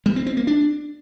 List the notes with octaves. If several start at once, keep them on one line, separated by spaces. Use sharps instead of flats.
G3
C4
C4
A#3
D4